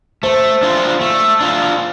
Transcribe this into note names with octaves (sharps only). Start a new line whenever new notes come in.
A3 C5
D4 F4
A3
D4 F4